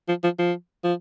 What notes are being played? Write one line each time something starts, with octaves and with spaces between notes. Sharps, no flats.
F3
F3
F3
F3